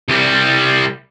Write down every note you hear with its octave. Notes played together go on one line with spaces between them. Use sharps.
C2 G3